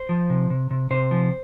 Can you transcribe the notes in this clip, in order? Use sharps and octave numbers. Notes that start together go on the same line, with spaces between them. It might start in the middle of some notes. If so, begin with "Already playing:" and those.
Already playing: C5
F3
C3
C3
C3
C3 C5
F3